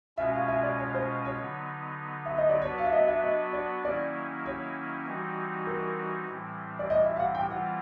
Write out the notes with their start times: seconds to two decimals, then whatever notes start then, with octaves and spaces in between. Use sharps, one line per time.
0.17 B2 G#3 C#4 F4 E5
0.34 F5
0.48 E5
0.63 D5
0.78 C#5
0.95 C5
1.25 C#5
1.40 D3 F#3 B3 D#4
2.25 E5
2.38 D#5
2.49 D5
2.62 F#3 B3 D4 F#4 B4 C#5
2.78 F5
2.86 E5
2.93 D#5
3.08 E5
3.23 D#5
3.53 D5
3.84 D#3 F#3 A#3 C#4 E4 D5
4.46 C#5
5.06 E3 G3 C4 D#4 F#4
5.67 A#4
6.29 A2 E3 G3 C4
6.79 D5
6.90 D#5
7.05 E5
7.16 F5
7.19 F#5
7.35 G5
7.50 E3 G3 C4 F4 F#5